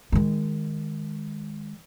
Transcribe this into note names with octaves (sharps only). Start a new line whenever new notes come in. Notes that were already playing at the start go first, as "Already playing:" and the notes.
D#3 G#3